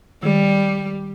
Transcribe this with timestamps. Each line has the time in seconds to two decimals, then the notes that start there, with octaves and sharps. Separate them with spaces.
0.23 D#3 G3